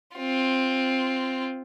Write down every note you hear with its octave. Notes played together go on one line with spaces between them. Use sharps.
C4 F4